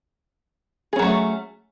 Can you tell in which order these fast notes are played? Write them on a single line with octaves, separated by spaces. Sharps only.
G#4 C#4 F#3 A3